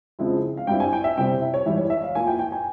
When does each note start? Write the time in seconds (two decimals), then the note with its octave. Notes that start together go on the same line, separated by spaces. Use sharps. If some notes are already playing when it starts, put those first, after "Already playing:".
0.19 C#3 F3 G#3 C4 E4
0.57 F5
0.67 G2 G3 C4 E4 G5
0.80 G#5
0.93 G5
1.04 E5
1.17 C3 G3 C4 E4 G5
1.42 E5
1.54 C#5
1.66 G#2 E3 G3 E5
1.78 C#5
1.90 E5
2.03 F5
2.15 A#2 F3 A#3 E4 G#5
2.27 G5
2.39 G5
2.52 G#5